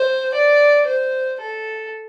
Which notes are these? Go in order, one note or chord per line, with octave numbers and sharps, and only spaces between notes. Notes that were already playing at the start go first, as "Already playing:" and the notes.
Already playing: C5
D5
C5
A4